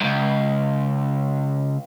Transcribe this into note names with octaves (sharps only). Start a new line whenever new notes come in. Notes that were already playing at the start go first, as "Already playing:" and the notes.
C#2 F#2